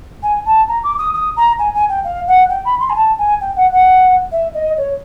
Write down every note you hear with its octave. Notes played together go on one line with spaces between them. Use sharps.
G#5
A5
A#5
D6
D#6
D#6
A#5
G#5
G#5
G5
F5
F#5
G5
B5
C6
G#5
A5
G#5
G5
F#5
F#5
E5
D#5
C#5